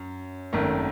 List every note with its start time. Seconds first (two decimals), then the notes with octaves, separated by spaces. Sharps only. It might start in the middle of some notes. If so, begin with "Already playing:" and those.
Already playing: F#2
0.53 G#1 F#2 D#3 A3